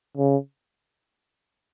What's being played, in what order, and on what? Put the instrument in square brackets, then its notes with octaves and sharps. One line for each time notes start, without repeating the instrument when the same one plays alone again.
[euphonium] C#3